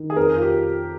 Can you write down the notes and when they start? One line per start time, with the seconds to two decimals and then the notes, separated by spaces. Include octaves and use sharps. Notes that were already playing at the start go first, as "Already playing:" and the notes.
Already playing: D#3
0.10 G#4
0.16 F2 A#4
0.37 F4
0.42 G4